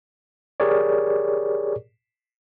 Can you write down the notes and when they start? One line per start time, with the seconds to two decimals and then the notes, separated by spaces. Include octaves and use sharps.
0.60 G4 G#4 A#4 C#5 D5